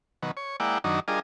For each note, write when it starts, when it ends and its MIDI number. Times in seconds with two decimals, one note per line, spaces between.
0.23 0.31 47
0.23 0.31 51
0.23 0.31 54
0.37 0.56 73
0.60 0.78 56
0.60 0.78 58
0.60 0.78 64
0.60 0.78 74
0.60 0.78 78
0.60 0.78 79
0.84 1.00 42
0.84 1.00 51
0.84 1.00 54
0.84 1.00 62
0.84 1.00 63
1.08 1.19 55
1.08 1.19 62
1.08 1.19 65
1.08 1.19 68
1.08 1.19 70
1.08 1.19 75